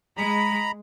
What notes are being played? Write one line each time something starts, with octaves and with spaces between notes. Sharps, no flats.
G#3 A#5 B5